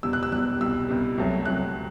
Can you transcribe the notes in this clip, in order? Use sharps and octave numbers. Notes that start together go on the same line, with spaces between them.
E2 B2 G3 E6
F#6
E6
E2 B2 G3 F#6
C2 B2 G3 E6
C2 B2 G3
C2 C3 F#3 A3
C2 C3 F#3 A3 F#6